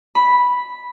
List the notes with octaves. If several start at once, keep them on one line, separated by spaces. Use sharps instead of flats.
B5